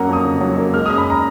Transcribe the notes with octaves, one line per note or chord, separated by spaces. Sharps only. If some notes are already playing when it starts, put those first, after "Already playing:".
Already playing: F#2 F#3 A#3 F#5 A#5
F2 D#6
C#3
F#3
A#3
G#3 F6
F#2 D#6
B5
A#5